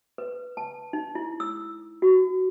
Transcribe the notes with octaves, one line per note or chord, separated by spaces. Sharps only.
B4
A5
D#4
E4
E6
F#4